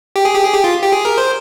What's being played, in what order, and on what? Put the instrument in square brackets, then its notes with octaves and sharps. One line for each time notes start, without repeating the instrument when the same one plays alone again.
[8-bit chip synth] G4
G#4
G4
G#4
G4
F4
G4
G#4
A#4
C5